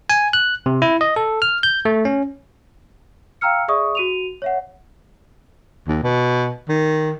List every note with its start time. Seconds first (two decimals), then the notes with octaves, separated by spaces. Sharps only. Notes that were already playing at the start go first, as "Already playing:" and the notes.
0.10 G#5
0.33 F#6
0.66 C3
0.82 E4
1.01 D#5
1.16 A4
1.42 F6
1.63 G6
1.85 A3
2.05 C#4
3.41 F5 G5 A#5 E6 F6 C#7
3.68 G#4 D5 E5 C#6 D#6
3.95 F#4 D#7 F7
4.42 C#5 E5 F#5
5.88 D#2
6.03 B2
6.68 D#3